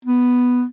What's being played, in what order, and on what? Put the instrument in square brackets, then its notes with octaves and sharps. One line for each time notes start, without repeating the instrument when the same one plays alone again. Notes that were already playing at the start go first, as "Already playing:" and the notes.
[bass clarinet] B3